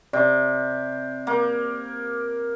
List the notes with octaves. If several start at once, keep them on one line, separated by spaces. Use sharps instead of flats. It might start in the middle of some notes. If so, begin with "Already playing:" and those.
C3 D5
A#3